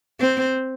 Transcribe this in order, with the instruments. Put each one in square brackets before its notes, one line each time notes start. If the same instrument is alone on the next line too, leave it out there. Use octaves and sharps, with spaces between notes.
[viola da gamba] C4